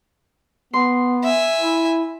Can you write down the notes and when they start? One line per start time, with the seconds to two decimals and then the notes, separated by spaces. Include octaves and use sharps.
0.73 B3 C6
1.24 E5 G#5
1.60 E4